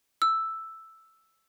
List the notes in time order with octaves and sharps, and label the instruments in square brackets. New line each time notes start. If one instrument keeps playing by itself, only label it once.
[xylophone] E6